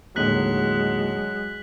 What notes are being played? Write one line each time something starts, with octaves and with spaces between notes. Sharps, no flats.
D#2 A2 D3 F#3 G#3 F#6 B6 F#7